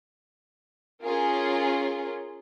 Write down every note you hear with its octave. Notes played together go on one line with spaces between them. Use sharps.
C#4 F4 G#4 A#4